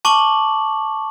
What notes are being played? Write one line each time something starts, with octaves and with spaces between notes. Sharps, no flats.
A5 C#6 D6 F#7